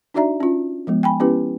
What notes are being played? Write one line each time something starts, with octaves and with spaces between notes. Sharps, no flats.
D4 D#4 F#4 D5 E5 A#5
C#4 F4
F3 G#3 B3
G5 G#5 B5
B3 C#4 E4 G4 B4